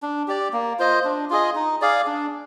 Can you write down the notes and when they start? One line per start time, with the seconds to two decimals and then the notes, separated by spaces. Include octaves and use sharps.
0.02 D4
0.28 G4 D5
0.53 A#3
0.79 F4 C5 D#5
1.05 D4
1.30 F4 G#4 D#5
1.55 D#4
1.81 G#4 D5 F5
2.06 D4